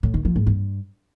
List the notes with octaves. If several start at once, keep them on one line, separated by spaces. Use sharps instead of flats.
A2
D#3
F3
G#2
G2